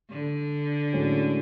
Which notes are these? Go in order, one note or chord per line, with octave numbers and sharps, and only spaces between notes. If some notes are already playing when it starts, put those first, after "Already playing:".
D3
A2 G#3 C#4 F#4